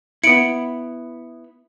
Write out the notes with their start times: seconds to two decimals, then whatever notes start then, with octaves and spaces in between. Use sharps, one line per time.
0.24 B3 E4 C#7 D7 F#7